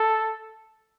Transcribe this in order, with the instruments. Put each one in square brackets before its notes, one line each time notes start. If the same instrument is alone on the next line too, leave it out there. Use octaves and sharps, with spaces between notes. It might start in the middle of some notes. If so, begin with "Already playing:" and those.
Already playing: [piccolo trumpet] A4